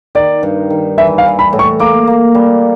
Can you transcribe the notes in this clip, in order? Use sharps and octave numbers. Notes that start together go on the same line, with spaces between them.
D#3 D5
G2
D#3
E3 E5
F5
E3
B5
A2
C#6
A#3 D6
A#3
G3